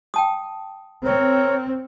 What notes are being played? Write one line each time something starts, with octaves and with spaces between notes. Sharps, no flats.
G5 A5 D#6
C4 A#4 C#5